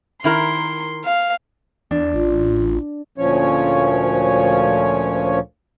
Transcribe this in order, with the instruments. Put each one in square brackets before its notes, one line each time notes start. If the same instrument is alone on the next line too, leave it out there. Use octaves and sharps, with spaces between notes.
[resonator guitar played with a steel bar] D#3 E4 A#4 [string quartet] C6
[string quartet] F5
[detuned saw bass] E2 [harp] D4
[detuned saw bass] A1 [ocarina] F4
[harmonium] D2 A#2 F3 C#4 C#5